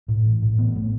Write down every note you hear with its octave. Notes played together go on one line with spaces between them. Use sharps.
A2
A1
A2
A1 B3
A2 A3